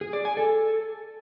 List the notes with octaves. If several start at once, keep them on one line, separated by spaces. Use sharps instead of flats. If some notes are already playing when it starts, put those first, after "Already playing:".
G#4
D5
G#5
A4